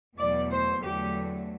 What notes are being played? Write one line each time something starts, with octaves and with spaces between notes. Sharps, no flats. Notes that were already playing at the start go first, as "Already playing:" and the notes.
E2 B2 F#3 A3 D5
C5
E2 D3 F#3 A3 G4